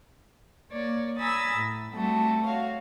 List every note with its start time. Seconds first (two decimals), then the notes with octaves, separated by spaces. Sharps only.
0.70 A#3 C#5 D5
1.18 G#5 A#5 B5 D#6 E6 A6
1.55 A2
1.91 G3 A3 C4 F#4 A4
2.45 F#4 C#5 F5